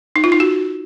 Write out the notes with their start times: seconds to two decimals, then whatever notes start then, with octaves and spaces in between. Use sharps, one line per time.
0.16 D#4
0.24 F4
0.32 D#4
0.40 F#4